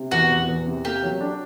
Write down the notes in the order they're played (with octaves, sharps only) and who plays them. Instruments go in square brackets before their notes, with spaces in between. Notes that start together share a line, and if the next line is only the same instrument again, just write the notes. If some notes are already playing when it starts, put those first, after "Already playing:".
Already playing: [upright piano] C3
[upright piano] E2 [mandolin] F#4
[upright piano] E2
E2
C3
[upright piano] A#3 [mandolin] G4
[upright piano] F#3
D4